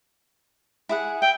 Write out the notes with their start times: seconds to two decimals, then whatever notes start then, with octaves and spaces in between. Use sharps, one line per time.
0.89 E4 G#4 F#5
1.22 E5 G5